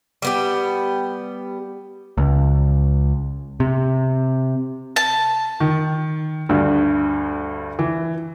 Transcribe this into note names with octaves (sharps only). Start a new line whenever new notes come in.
G3 B3 G4
C#2
C3
A5
D#3
D2 G2
E3